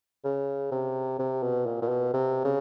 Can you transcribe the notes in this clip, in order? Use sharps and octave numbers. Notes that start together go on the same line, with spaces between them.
C#3
C3
C3
B2
A#2
A#2
B2
C3
C#3